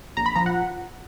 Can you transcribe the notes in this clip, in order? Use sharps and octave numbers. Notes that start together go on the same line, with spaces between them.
A#1 A#5
B5
F3 A#5
F#5